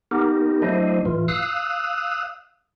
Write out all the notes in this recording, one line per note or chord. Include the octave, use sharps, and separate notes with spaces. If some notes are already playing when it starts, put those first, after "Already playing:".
B3 D#4 G4 A#4
F#3 A3 D4 E4 C5 D#5
A2 E3 F4
F5 D#6 E6 F#6